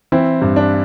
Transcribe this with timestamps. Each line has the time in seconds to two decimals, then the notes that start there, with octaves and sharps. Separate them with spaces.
0.12 E3 C4 E4
0.42 G2
0.56 D4